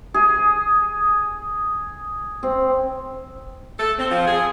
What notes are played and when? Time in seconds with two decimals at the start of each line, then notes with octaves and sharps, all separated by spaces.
0.14 G#4
2.43 C4
3.79 A4
3.99 C4
4.11 F3
4.27 G#4